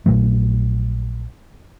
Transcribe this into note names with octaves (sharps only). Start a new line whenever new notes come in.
A#1 A#2 F#3 A3